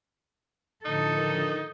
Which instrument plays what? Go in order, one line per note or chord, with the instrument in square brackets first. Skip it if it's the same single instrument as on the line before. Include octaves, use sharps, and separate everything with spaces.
[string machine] A2 D3 F3 [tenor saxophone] D#4 [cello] A4
[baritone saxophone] D#3